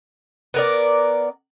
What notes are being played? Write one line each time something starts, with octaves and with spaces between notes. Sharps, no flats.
B3 A#4 D5